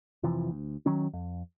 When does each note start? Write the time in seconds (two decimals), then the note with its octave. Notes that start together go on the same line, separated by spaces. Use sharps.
0.23 F1 C3 E3 F3
0.51 D2
0.86 D#3 F#3 C#4
1.13 F2